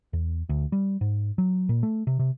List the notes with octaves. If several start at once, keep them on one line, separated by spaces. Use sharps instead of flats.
E2
D2
G3
G#2
F#3
A#2
A3
C3
C3